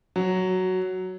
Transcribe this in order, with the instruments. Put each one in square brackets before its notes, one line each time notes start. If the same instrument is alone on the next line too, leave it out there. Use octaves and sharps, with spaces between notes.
[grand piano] F#3